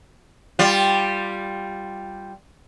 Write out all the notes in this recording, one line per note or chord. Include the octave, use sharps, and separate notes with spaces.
G3 F4